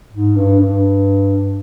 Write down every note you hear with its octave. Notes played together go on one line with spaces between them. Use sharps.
G#2
G2
G2